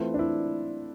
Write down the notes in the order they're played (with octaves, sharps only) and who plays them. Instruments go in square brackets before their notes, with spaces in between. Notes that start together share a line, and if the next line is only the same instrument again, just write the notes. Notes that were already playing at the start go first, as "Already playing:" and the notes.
Already playing: [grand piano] E3 A3 C4 F4 B4
[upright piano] D4
E4